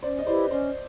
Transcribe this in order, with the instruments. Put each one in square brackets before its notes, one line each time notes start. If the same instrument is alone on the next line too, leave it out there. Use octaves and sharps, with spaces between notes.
[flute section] C#4 [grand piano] C5 D5
[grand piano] D#5
[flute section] E4 G4 B4 [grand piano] C5 D5
[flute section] C#4 [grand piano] C5 D5